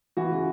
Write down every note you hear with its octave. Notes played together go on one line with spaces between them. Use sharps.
E3 F#4
C#3